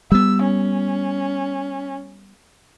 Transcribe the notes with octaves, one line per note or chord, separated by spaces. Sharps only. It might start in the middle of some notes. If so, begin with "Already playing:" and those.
G3 B3 E6
C#4